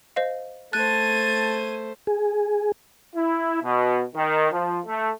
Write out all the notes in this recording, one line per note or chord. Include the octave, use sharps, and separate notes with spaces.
C5 D#5 F5
A3 C5 A5 F#6 G#6 D#7
G#4
E4
B2
D#3
F3
A3